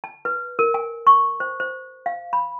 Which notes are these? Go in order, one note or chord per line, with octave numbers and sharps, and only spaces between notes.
A5
B4
A#4
G#5
C#6
C5
C5
F5
B5